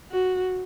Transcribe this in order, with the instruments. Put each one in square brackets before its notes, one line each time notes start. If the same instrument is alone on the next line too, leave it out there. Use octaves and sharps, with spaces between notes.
[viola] F#4